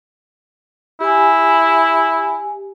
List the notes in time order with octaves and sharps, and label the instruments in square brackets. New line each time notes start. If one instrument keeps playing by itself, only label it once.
[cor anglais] E4 [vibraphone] G4 G#5